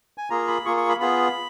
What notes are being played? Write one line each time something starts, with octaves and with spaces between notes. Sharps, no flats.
G#5
A#3 F4 G#4 A#5
B5
A#3 F4 G#4 C#6
C#6
B5
B3 F4 G#4 B5